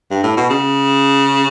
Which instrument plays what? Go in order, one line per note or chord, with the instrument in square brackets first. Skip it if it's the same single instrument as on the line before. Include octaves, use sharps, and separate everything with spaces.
[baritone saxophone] G2
A2
B2
C#3